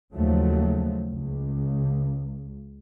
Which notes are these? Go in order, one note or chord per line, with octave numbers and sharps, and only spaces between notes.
D#2 C#3 F3 F#3 A3
C#2